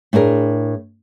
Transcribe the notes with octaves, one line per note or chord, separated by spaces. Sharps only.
A2 D4 G#4 A#4